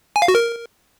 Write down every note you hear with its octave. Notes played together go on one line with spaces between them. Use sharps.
G#5
F5
F#4
A#4